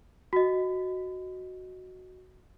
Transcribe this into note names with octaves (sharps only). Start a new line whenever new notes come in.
F#4 D#5